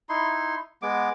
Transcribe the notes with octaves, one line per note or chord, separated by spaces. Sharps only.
D#4 E4 C6
G#3 B3 D6